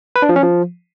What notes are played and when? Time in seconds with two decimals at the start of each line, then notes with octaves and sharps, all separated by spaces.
0.16 B4
0.22 D4
0.29 F3
0.36 C#4
0.43 F3